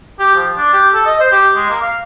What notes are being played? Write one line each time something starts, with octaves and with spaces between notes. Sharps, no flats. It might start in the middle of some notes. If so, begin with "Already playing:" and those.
G4
F3
D4
G4
A4
D#5
C5
G4
G#3
A#3
F5